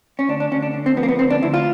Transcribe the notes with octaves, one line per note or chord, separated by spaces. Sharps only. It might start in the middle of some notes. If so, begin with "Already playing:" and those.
C#4
D2 D4
D4
D2 C#4
D4
D3
C4
F3 B3
A#3
B3
D2 C4
D4
D2 E4
F4